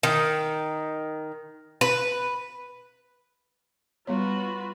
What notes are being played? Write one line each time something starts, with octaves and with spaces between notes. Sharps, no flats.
D#3
B4
G3 B3 F4 F#4 B4 C#5